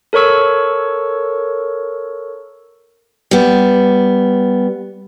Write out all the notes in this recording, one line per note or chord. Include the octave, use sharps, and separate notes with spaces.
A4 A#4 C#5 C#6 E6
G3 B3